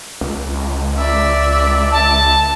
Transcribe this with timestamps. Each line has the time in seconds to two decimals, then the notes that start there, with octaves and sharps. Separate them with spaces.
0.21 C#2
0.97 D5 E5
1.92 A5